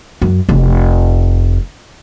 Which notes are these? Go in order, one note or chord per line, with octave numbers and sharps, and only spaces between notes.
F#2
F1